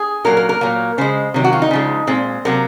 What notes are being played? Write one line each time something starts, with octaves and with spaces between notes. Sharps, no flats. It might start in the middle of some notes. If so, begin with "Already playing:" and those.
Already playing: G#4
A#2 F#3 A#3 A#4
A#4
A#4
A#2 F#3 A#3
C#3 G#3 C5
C3 D#3 F#3
F#4
F4
D#4
C#3 F3 G#3
A#2 G#3 C4
C3 F#3 A#3 A#4